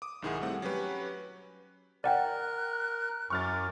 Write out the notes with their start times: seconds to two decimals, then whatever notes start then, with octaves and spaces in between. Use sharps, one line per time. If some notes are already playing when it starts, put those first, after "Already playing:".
0.02 D6 D#6
0.22 B1 G#2 D#3 E4 G#4 F#5
0.41 G3 A3 C4 F#5
0.62 F#3 C#4 F#4 G4 B4
2.04 A#4 D5 F#5 G5 F#6
3.30 F#2 C#6 D6 F6 A6